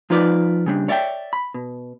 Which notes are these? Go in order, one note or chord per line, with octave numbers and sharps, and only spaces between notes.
F3 D#4 F4 B4 D5
C#3 G3 D4
C#5 D5 E5 F#5 G5
B5
B2